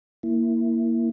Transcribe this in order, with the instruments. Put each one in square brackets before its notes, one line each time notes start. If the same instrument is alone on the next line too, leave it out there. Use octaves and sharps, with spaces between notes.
[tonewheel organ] A#3 E4